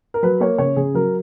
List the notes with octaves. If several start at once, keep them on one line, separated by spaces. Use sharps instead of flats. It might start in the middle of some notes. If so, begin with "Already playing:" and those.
A#4
F#3 B4
A#3 C#5
C#3 C#5
C#3 G#4
F#3 A#4